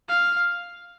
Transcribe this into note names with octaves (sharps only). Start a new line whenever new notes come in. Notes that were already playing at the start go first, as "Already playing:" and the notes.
F5